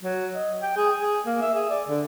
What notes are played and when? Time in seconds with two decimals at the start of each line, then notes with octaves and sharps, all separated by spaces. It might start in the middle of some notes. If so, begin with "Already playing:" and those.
0.03 F#3
0.35 D#5
0.62 G5
0.76 G#4
0.99 G#4
1.26 A#3
1.42 E5
1.54 G#4
1.70 D5
1.88 D3